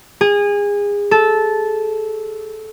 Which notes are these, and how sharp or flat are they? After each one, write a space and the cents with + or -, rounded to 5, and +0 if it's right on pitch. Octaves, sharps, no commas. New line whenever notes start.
G#4 -25
A4 -15